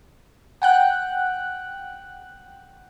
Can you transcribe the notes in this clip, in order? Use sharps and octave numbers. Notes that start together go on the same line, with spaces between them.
F#5 G5 F#6